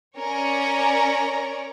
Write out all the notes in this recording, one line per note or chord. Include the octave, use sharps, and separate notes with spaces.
C#4 A#4 C#5 D5 A#5